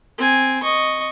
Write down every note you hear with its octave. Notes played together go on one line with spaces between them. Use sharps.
C4 G#5
D#5 C#6